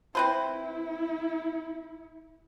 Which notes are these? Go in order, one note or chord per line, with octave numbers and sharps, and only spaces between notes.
C4 E4 B4 C5